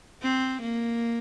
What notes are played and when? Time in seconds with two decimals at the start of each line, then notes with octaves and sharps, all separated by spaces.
0.22 C4
0.61 A#3